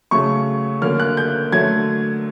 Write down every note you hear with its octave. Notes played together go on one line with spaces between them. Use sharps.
C#3 F#3 A3 C#6
D3 F#3 A#3 F6
F#6
G6
D3 F#3 A3 G#6